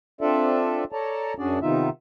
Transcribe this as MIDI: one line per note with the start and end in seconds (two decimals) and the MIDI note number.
0.21 0.84 60
0.21 0.84 62
0.21 0.84 65
0.21 0.84 69
0.21 0.84 74
0.21 0.84 76
0.92 1.34 69
0.92 1.34 73
0.92 1.34 74
0.92 1.34 81
0.92 1.34 82
1.39 1.59 42
1.39 1.59 61
1.39 1.59 62
1.39 1.59 66
1.39 1.59 68
1.39 1.59 74
1.62 1.89 48
1.62 1.89 51
1.62 1.89 59
1.62 1.89 63
1.62 1.89 65
1.62 1.89 76